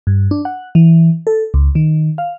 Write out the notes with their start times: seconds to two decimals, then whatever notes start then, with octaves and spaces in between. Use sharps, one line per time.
0.07 G2
0.31 D4
0.45 F#5
0.75 E3
1.27 A4
1.54 C#2
1.75 D#3
2.18 F5